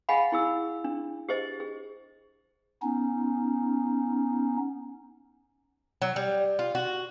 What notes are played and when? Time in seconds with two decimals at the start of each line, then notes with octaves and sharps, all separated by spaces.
0.09 G#4 D#5 F5 F#5 G#5 B5
0.32 E4 G#4 E6
0.84 D4
1.29 G4 G#4 C5 D#5
1.60 G#4
2.83 B3 C#4 D#4
6.02 F#3
6.16 G3
6.59 F4
6.75 F#4